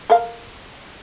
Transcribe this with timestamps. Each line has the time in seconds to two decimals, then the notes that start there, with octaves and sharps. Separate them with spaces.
0.10 A4 A#4 F5